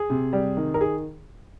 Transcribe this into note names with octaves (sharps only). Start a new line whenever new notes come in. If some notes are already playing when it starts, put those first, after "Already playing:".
Already playing: G#4
C3
G3
D#3
A#4
D#3 G#4